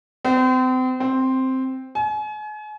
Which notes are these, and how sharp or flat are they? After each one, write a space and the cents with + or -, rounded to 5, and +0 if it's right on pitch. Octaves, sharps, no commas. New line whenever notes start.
C4 -35
C4 +0
G#5 +40